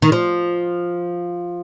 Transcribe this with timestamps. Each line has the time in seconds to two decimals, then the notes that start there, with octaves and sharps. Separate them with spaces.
0.02 D#3
0.12 F3